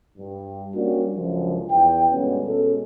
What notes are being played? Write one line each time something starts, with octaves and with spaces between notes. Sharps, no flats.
G2
G3 A#3 C#4 D4 F#4 G4
C#2 F#2 D3 F3
E2 G5
G2 B2 D3 G#3 B3 C#4
B2 G#3 C#4 A4